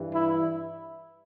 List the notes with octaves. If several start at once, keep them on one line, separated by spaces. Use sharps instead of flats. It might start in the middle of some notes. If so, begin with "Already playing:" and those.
Already playing: G2 E3 G3
E4